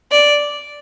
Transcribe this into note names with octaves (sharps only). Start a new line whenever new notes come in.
D5